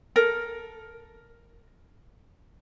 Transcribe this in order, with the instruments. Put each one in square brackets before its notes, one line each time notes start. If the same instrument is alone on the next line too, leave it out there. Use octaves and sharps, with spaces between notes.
[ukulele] A4 A#4